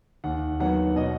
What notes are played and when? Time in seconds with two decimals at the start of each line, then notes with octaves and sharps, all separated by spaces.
0.24 D#2 F#5
0.60 D#3 F#3 B3 F#5
0.96 B2 D#5